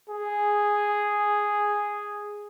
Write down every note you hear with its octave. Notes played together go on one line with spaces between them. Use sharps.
G#4